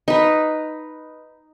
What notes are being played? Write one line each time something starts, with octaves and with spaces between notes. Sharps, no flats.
D#4 B4